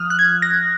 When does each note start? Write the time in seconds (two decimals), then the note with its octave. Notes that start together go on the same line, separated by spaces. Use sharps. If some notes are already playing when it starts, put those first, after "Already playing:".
Already playing: F3 D#6 F6 F#6
0.10 F#6
0.19 G#6
0.42 A#6